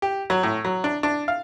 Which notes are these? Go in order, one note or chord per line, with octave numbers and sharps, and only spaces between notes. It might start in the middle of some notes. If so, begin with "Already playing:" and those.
G4
F#3
A2
F#3
D4
D4
F5